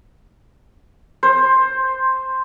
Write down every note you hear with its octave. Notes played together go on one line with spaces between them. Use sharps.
C5